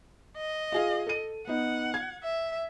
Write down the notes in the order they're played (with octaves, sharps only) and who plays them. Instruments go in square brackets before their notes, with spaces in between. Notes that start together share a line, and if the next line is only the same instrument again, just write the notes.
[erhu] D#5
[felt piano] F4 G#4 F5
A4 D#7
[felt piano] B3 D#4 [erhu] F#5
[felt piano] G#6
[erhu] E5